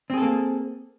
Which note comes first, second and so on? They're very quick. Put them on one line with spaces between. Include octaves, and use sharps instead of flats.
C4 G#4 A4 A#3